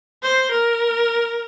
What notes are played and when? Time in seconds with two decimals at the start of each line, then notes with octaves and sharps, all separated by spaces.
0.23 C5
0.52 A#4